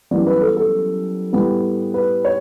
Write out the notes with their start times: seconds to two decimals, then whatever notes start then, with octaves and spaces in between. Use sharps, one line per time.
0.11 F#2 E3 G3 B3 D5
0.27 B4
0.42 A4
0.57 A4
1.33 A2 G3 B3
1.94 B4
2.25 C#5